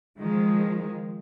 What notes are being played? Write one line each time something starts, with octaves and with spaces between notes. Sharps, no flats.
D#3 F3 G#3